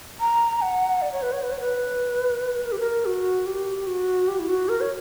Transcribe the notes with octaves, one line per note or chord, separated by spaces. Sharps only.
A#5
F#5
D5
C#5
B4
C#5
B4
C#5
B4
A#4
G4
A#4
F#4
G4
F#4
G4
E4
F#4
A#4
C#5